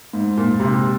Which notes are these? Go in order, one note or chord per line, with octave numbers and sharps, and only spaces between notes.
G#2
A#2
C3